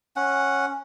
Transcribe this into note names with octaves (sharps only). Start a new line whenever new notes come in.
C#4 F#5